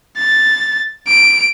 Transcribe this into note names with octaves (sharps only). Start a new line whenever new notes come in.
A6
D7